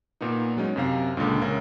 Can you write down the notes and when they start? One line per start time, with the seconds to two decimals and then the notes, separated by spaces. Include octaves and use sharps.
0.21 A#2 A#3 B3 D#4
0.57 F#3 G#3 C#4 D#4
0.76 F#2 C3 F5
1.17 C#2 A#2 D3
1.41 C#2 C#4 A#4 E5